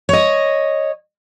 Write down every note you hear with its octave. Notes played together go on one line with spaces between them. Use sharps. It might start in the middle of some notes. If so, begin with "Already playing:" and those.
C#5 D#5